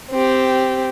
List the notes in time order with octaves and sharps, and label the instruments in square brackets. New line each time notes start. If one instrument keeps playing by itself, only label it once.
[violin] C4 G4